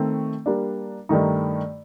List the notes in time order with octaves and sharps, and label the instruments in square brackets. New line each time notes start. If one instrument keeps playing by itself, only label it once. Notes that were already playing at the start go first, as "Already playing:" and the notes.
Already playing: [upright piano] D#3 A3 C4
G3 A#3 D4
G2 D#3 A3 D#4